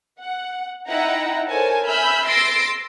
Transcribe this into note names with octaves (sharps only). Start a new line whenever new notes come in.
F#5
D#4 E4 F#5 G5 A#5
A4 A#4 C5 C#5 G#5 A5
E5 G#5 B5 E6 F6 G6
C6 E6 A6 A#6 C7 D7